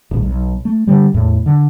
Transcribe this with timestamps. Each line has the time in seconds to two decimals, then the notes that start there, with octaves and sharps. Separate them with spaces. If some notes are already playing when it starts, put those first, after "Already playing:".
0.11 D1 A1
0.22 B1
0.65 A3
0.87 D3 G3
1.14 E2 A2
1.46 D3